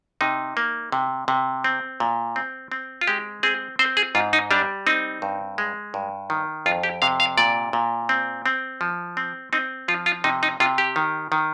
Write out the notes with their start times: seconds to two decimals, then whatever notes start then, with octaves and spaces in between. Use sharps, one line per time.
0.21 C3 D#4
0.57 A#3
0.92 C3
1.28 C3
1.64 C4
2.00 A#2
2.36 C4
2.72 C4
3.01 F4
3.07 G#3 G4
3.43 C4 G#4
3.79 C4 C5
3.97 G#4
4.15 G#2 F4
4.33 D#4
4.51 G3 D4
4.87 C4 D#4
5.22 G2
5.58 G#3
5.94 G2
6.30 D#3
6.66 F2 F4
6.83 G4
7.02 C3 F5
7.20 F5
7.38 A#2 D5
7.73 A#2
8.09 C4
8.46 C4
8.81 F3
9.17 C4
9.53 C4 D#4
9.88 F3 F4
10.06 F4
10.24 C3 D#4
10.43 D#4
10.60 C3 F4
10.78 G4
10.96 D#3
11.32 D#3